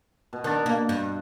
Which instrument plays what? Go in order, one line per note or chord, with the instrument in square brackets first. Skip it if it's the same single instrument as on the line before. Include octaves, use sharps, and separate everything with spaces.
[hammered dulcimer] B2
[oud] D#3 [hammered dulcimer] D4 F#5 A5
[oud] A#3
G2